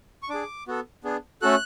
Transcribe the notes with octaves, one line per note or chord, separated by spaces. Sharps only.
C#6
D4 G#4 D6
B3 F#4 A4
B3 D4 G#4
A3 C#4 F#4 A4 F#6